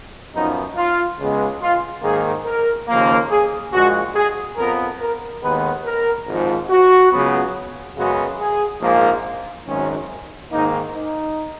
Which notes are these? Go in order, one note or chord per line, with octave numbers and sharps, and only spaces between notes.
F#2 F3 B3 D#4
F4
C#2 C#3 G#3 B3
F4
G#2 D#3 A#3 G#4
A#4
D#2 C#3 F3 A#3
G#4
A#1 A#2 G#3 F#4
G#4
F2 F3 B3 A#4
A#4
D#2 D#3 G#3 B3 B4
A#4
G#1 G#2 F3
F#4
C#2 C#3 F#3 B3
F#2 C#3 G#3 B3 F#4
G#4
A#1 G#2 F3 A#3
G#1 F#2 D#3 G#3 C#4
G#2 D#3 A#3 D#4
D#4